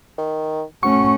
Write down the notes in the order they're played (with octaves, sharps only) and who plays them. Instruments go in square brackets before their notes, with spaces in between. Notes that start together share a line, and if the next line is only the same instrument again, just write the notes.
[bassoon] D#3
[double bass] A3 C#4 [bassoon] F#4 [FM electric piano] C#6